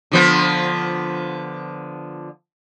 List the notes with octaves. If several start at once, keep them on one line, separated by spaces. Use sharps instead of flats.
D3 F3 B3